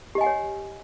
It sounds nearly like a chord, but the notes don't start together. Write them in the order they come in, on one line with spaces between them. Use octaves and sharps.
G4 D#5 G#5 F#5 C#5